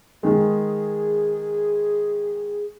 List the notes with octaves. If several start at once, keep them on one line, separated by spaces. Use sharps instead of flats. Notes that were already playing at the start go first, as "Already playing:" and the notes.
D#3 G#3 G#4